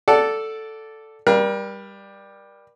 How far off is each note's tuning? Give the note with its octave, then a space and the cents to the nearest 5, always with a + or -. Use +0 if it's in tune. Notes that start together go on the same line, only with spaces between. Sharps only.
A4 +0 D5 -5 F#5 +0
G3 +10 A#4 +40 F5 -25